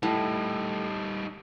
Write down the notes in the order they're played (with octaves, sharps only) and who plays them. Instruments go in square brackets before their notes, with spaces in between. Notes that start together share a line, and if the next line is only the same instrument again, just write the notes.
[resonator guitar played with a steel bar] A2 [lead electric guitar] G3 D#4